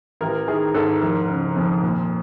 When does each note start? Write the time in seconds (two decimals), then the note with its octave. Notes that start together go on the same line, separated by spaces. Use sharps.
0.21 A1 A#4
0.48 D#3 G#4
0.74 G#2 A4
1.01 F1 A#4
1.28 C#3
1.56 F2
1.83 A#2